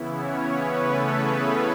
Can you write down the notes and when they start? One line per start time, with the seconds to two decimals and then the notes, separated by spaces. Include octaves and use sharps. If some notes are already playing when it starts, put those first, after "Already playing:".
Already playing: C#3 E3 B3 E4
0.16 C#4 C#5
0.48 B3 B4
0.81 A3 A4
1.14 G#4